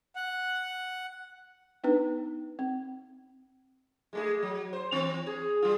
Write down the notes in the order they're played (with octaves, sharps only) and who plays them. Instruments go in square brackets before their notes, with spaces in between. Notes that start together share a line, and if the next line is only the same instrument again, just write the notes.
[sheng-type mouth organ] F#5
[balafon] B3 D4 D#4 B4
C4
[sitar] G#3 A3 G#4
F#3
C5
E3 C4
G#4
G3 F4